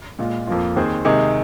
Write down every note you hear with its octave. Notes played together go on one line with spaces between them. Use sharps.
A#2 G#3 F4
F2 F3 A#3 F4
D#2 D#3 C4 G#4 C5
C3 D#3 G#3 D#4 G#4